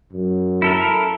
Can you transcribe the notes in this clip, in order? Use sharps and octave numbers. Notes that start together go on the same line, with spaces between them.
F#2
E4 A4 A#4